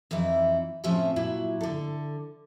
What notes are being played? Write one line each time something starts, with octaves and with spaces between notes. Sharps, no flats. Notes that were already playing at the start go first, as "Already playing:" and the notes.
F2 E3 D#4 E4
A2 C3 F3 C#4 C#5 E5
A#2 F#3 E4
D3 A4